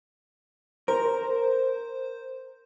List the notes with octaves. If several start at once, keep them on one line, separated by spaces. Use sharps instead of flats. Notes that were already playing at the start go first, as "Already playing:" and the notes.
A#4 C5